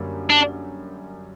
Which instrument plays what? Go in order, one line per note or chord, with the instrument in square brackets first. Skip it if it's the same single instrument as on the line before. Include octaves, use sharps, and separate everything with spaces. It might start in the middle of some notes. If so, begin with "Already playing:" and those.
Already playing: [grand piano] F#2 D3 G3 A#3
[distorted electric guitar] D4